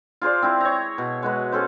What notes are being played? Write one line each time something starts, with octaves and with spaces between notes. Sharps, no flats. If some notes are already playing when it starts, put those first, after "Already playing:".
F4 G#4 C5 D5
C4 E4 C5
C#5 A#5
B2
G#3 F#4 B4
C#4 G#4 A4 C5